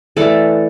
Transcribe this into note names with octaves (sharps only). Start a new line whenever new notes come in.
E3 A3 A4 D5